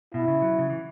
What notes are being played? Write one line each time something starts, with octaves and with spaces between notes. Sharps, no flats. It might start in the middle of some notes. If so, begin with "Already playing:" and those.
B2 E4
C#3
F#3
C#3
E3